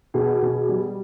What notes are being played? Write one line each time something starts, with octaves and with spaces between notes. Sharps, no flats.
B2 G#4
B2
G3